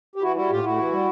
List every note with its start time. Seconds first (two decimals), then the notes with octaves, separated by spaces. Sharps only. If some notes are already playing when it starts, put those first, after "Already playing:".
0.16 G4
0.22 E3 E4 F#4
0.36 G3 E4 F#4
0.50 A2 F4 G4
0.64 A2 E4 F#4
0.78 E3
0.92 G3